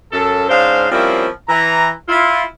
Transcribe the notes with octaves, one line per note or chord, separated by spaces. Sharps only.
F#2 A4
G#2 C#4 D4 C5 F5
F3 G3 A#3 C4 C#4 E4
E3 A#5
E4 F4